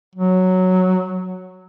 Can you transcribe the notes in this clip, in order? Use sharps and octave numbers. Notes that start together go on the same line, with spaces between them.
F#3